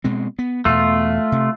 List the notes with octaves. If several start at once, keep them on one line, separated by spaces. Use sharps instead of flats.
B2 G#3 C4
B3
E2 B2 A3 F4
C3